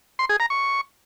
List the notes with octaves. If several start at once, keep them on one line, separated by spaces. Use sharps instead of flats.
C6
G#4
A#5
C#6